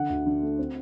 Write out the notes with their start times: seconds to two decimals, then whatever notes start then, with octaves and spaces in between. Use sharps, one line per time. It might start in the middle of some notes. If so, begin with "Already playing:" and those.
Already playing: D3 F#5
0.10 D2
0.26 D3
0.43 A3
0.59 C4